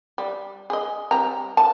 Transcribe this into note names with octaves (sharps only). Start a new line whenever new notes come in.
G3
G#4 D#5
G3 C4 A#5
A5